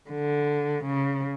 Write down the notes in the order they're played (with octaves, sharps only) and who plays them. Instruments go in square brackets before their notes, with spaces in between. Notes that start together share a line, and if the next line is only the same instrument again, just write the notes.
[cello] D3
C#3